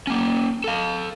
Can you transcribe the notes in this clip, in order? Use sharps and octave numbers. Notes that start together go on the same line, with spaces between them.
A#3 C#4
A4 F5